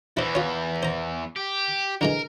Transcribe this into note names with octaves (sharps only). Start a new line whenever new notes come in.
E2 E3 E4 C5
F4 C#5
C5 A#5
G4
D3 E3 G#3 A#4